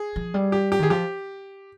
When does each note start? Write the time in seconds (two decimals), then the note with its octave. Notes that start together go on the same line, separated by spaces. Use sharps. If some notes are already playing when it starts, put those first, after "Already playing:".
Already playing: G#4
0.16 F3
0.34 G3
0.52 G4
0.72 G4
0.79 D#3 G#4
0.90 F3 G4